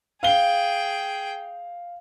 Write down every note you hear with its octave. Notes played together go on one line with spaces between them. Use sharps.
G#4 F5 G5 G7